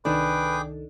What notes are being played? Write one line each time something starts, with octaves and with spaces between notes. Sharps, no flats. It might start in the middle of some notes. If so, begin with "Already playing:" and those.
C2 D#3 D4 G#4 A4 B4 G5 D6